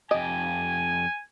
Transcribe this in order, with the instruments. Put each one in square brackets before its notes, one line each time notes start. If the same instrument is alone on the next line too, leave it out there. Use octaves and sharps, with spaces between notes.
[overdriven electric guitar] F2 G4 [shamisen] D#5 [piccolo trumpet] G#5